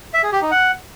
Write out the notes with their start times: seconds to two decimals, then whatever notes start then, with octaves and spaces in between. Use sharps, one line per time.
0.14 E5
0.23 G#4
0.32 G4
0.42 D#4
0.51 F#5